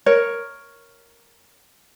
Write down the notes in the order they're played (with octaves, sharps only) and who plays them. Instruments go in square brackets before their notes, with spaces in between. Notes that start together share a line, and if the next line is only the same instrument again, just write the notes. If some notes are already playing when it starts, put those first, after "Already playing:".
[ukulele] A#4 C#5